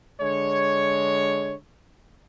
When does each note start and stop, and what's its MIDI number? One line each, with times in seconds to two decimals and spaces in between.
0.21 1.54 50
0.21 1.54 56
0.21 1.54 73